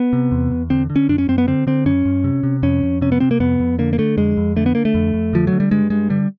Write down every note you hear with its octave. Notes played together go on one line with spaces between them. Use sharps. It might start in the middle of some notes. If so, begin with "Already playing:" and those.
Already playing: B3
C3
E2
E2
D3 C4
D3
C#4
F#2 D4
C#4
F#2 C4
B3
D3 C4
D3 C4
F#2 C#4
F#2
C3
C3
F2 C#4
F2
C3 C#4
B3
C3 C4
A#3
F2 B3
F2
D3 A#3
A#3
D3 A3
F2 G#3
F2
D3 A3
B3
D3 A#3
A3
F2
F2
D3 F3
F#3
D3
G3
G2 G#3
G2 G#3
D3 G3